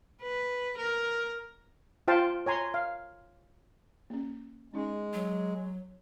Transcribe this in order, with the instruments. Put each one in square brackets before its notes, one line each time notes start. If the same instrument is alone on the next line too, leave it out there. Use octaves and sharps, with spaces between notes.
[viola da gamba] B4
A#4
[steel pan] F4 C5 F5 G5 A5
C#5 G#5 A#5 C6
F5
[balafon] A#3 C#4
[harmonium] G#3 [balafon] C#4 D#4
[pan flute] F#3